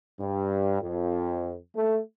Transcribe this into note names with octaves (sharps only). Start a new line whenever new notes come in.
G2
F2
A3